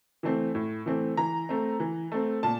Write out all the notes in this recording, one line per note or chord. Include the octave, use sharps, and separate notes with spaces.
E3 A3 C4
A2
E3 A3 C4
E3 A#5
A3 C4
E3
A3 C4
A#2 A5